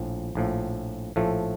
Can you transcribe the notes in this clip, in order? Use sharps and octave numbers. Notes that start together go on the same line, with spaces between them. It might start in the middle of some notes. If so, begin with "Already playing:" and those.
Already playing: A#1 A2 F3
A#1 A2 F3
A#1 A2 F3 A3